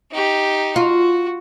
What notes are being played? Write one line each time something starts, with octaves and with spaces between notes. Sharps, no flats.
D#4 G4
F4 F#4